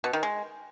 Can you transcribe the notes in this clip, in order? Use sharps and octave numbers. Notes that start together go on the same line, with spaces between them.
B2
D#3
G#3